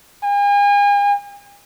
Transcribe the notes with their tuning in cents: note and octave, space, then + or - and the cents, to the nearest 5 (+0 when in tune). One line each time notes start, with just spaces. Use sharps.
G#5 -40